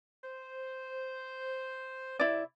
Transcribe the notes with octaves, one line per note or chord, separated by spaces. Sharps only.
C5
C3 E4 D5 E5